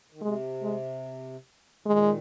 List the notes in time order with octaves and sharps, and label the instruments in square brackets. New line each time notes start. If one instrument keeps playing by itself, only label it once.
[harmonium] D#3
[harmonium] C3 [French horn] G#3
[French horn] G#3
[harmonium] A#2 D#3 [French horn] G#3